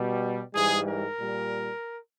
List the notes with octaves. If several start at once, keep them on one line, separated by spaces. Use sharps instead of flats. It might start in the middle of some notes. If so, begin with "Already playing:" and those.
Already playing: B2 G3
G#2 E3 G3 G#4
A#4
A#2 G3